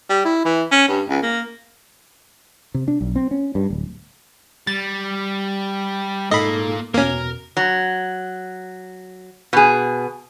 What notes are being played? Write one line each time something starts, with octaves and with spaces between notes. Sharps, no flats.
G3
E4
E3
C#4
G2
C#2
A#3
C3
D4
B1
C4
C#4
G2
D1
G3 A6
G#2 A#3 F4 A4 D#5 B5 E6
E2 B2 A#3 C#4 A#4
F#3
B2 G#4